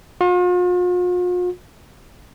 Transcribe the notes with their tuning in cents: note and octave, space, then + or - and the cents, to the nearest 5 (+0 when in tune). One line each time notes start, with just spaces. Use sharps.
F4 +45